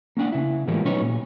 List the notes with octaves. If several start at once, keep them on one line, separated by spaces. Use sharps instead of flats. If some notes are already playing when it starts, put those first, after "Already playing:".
A#3 C#4 D4 F#5
C#3 E4
A2 E3 F3 G3 G#3 A#3
B2 F#3 C#4 D#4 B4 C#5
A#2